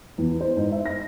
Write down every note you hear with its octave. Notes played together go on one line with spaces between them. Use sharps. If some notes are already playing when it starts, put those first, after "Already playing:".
E2
C5
G#2
E5
A#6